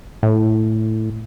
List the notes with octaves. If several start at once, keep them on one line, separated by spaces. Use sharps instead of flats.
A2